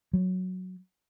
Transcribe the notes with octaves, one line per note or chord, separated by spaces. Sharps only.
F#3